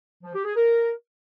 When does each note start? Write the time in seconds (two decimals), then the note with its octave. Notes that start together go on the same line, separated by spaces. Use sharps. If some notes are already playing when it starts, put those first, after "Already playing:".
0.23 F3
0.34 G4
0.45 G#4
0.56 A#4